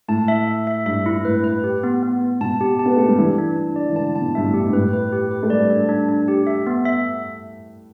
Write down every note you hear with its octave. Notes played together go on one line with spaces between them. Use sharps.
A2 A5
E5
E5
E5
G2 E5
E4
A2 B4
B4
G4
B3
B3
B3
B2 A5
G4
A5
B3
A3 G4
G3
E3 D4
D4
D4
D5
E3
D3 A5
A5
B2
G2 E5
A2
G4
G2
A2 B4
B4
G4
B4
A3
G3 D5
D4
D4
D4
G4
E5
B3
E5